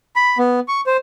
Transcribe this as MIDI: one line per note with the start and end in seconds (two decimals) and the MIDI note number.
0.16 0.38 83
0.38 0.60 59
0.68 0.81 85
0.86 0.97 72